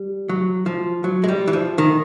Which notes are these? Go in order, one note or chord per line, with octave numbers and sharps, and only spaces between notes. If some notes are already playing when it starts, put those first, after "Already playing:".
Already playing: G3
F#3
F3
F#3
G#3
G3
E3
F3
D#3